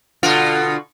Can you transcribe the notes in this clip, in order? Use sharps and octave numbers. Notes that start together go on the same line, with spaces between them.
B2 D3 F4